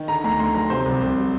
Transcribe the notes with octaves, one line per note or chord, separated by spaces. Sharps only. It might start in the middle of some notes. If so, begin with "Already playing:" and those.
Already playing: D#3
D3 A#5
D2 A#5
D2 C6
F#3 A#5
C3 C5
C2
C2
F#3